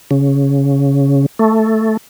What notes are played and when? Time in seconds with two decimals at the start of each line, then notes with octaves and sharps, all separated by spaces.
0.11 C#3
1.39 A3